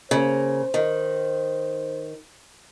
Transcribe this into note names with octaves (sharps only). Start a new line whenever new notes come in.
C#3 A#3 C5
D#3